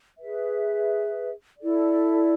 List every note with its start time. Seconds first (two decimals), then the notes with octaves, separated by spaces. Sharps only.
0.19 G#4 B4 E5
1.58 E4 A4 D5